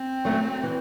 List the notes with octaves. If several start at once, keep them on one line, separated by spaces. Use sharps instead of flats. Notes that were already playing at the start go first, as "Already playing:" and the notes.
Already playing: C4
F#3 A3 C#4
E3